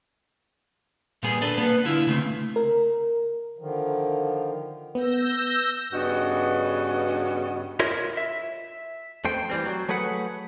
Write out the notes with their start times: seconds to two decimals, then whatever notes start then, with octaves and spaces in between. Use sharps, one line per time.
1.23 A#2 G3 B3 G#4
1.42 D4 A4 B4
1.58 A#3 B3 B4
1.85 D3 E4 F4
2.07 C#3 A3 C4
2.56 A#4
3.59 D3 D#3 F3
4.95 B3 E6 G6 A#6
5.92 G2 C#3 B3 F#4 D#5
7.80 E4 F4 A#4 C#5 D#5
8.17 E5
9.25 F2 A3 C5 G5
9.50 E3 G3 C4
9.66 F#3
9.89 F#3 A3 G#4 B4 F#5